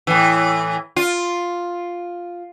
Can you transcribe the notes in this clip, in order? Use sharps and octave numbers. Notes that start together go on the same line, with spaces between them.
A2 E3
F4